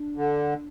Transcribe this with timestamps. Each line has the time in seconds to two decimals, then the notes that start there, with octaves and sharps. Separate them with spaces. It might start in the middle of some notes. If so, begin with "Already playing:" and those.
Already playing: D4
0.17 D3